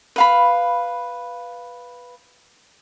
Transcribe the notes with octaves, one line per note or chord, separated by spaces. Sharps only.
B4 F5 B5